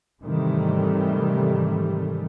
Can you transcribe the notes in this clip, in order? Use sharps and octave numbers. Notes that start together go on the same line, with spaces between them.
G#2 C3 D#3 E3 G3 A3